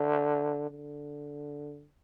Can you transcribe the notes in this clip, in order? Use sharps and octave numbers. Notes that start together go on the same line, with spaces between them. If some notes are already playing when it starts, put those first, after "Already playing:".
Already playing: D3
D3